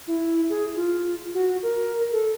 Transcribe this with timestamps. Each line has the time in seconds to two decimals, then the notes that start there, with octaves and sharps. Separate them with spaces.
0.07 E4
0.50 G#4
0.76 F4
1.34 F#4
1.62 A#4
2.12 A4